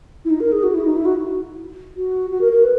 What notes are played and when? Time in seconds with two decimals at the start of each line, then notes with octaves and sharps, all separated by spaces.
0.25 E4
0.30 D#4
0.40 A#4
0.52 G#4
0.63 F#4
0.74 E4
0.85 D#4
0.96 E4
1.05 F#4
1.96 F#4
2.31 F#4
2.41 A#4
2.52 A#4
2.64 B4